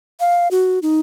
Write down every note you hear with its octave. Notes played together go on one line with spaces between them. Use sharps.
F5
F#4
D#4